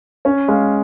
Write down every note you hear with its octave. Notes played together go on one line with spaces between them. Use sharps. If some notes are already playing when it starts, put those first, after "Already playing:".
C#4 C#5
G#3 F5